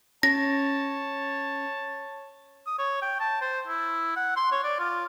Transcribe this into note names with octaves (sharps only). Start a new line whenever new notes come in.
C#4 C#5 A5 A#6
D#6
C#5
G5
A5
C5
E4
F#5
C6
C#5
D5
F4